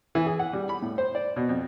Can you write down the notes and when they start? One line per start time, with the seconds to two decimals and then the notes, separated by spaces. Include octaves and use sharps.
0.15 E3
0.26 G#4
0.39 F#5
0.53 G3
0.69 B5
0.82 A2
0.98 C5
1.15 D5
1.36 B2
1.49 F2